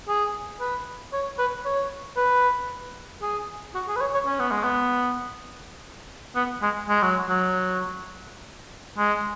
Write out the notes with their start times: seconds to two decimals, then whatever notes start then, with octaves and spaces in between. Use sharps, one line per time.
0.08 G#4
0.60 B4
1.13 C#5
1.39 B4
1.65 C#5
2.17 B4
3.22 G#4
3.75 F#4
3.88 G#4
3.96 B4
4.01 C#5
4.14 C#5
4.26 C#4
4.40 B3
4.51 G#3
4.64 B3
6.35 B3
6.62 G#3
6.88 G#3
7.02 F#3
7.29 F#3
8.98 G#3